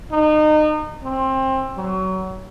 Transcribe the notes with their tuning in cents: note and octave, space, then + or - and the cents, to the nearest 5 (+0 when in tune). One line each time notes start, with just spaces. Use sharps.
D#4 -30
C4 +25
F#3 +25